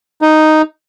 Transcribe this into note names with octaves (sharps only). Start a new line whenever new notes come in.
D#4